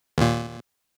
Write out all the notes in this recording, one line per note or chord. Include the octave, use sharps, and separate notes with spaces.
D#2 A#2